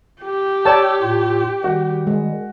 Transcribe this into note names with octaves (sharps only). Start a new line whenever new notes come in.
G4
A4 C#5 D5 A5 D6 E6
A2 F4
D#3 G3 F#4
G#3